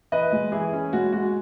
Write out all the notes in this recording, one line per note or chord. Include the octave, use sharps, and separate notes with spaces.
E3 B4 D#5
G#3
E3 E4 G#4
C#4
G#3 F#4
G#3 F#4